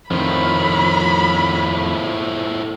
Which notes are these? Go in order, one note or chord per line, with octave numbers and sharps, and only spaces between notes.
F2 A2 D#3 F3 B5